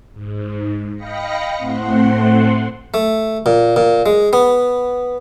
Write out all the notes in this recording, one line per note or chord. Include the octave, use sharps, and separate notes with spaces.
G#2
D#5 F5 G5 B5 A#6 C#7
A2 A3 C4 F#5 C6
A3
A#2
A#2
G#3
B3